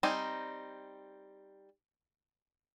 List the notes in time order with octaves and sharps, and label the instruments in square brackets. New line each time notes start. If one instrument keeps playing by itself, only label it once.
[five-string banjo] G3 C4 D#4 G#5